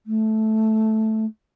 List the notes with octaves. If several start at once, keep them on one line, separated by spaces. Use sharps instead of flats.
A3